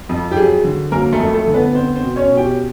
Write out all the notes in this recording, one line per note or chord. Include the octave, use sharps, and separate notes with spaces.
F2
G4
F#3 G#4
D3
F#3 A#3 A#4
A3 A4
F2
A3 A4
D3
B3 B4
B3 C4 C5
C4 C5
B2
C#4 C#5
B2
G4 G5